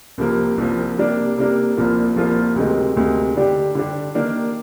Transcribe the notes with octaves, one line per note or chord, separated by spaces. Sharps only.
C2 C3 F3 A#3
C2 C3 F3 A#3
C3 G3 A#3 D4
C3 G3 A#3 D4
C2 A#2 F3 A#3 F4
C2 A#2 F3 A#3 F4
D2 C3 D#3 G#3
D2 C3 D#3 G#3
D3 G3 D4 G4
D3 G3 D4 G4
D#3 A#3 D4